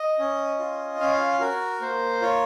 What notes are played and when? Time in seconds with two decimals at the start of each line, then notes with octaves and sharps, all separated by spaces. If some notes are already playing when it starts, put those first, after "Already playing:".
Already playing: D#5
0.19 C#4
0.59 F4
1.00 C#4 F5
1.41 F#4 A#4
1.81 A#3 C5
2.21 F4 C#5